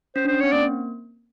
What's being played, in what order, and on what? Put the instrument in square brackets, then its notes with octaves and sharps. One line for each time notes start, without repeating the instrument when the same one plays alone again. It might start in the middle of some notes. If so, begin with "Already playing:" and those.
[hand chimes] C#4 [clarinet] C5
[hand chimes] D4
[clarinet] C5
[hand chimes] C#4
[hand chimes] C4 [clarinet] C#5
[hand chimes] A#3 [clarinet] D5